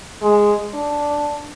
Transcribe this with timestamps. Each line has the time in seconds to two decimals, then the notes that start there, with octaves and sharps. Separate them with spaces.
0.22 G#3
0.74 D4